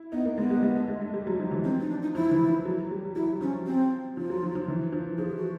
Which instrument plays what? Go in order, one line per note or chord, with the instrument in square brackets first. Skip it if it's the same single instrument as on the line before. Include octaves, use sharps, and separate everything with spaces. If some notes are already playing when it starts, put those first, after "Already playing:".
Already playing: [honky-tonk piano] E4
[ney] B3 [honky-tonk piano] D#4
[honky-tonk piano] A#3
[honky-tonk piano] G#3 [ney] B3
[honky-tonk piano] G3
G#3
A3
G#3
A3
G3
F#3
F3
E3
[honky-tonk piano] F3 [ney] C4
[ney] D#4
D4
D#4
[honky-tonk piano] F3 [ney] E4
[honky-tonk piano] E3
F3
F#3
G3
[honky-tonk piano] F#3 [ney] E4
[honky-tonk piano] F3 [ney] C#4
[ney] C4
[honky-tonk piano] F3 [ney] F4
[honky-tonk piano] F#3
F3
F3
E3
F3
[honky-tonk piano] F3 [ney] G#4
[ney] G4
F#4